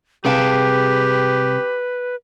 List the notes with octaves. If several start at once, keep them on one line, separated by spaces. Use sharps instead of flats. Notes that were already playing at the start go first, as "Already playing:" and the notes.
C2 C3 G4 G#4 B4 F5 G5 A5